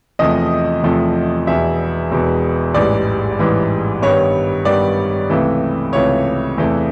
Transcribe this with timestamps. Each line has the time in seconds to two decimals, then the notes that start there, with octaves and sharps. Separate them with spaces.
0.19 E2 C3 F3 A3 D#5
0.83 E2 C3 F3 A3
1.47 E1 E2 B2 E5
2.11 E1 E2 B2
2.74 A1 G#2 E3 G3 D5
3.39 A1 G#2 E3 G3
4.02 G2 D#3 G3 B3 C#5
4.65 G2 D#3 G3 B3 D5
5.30 C#2 C3 E3 A3
5.93 C#2 C3 E3 A3 C#5
6.57 E2 C3 E3 A3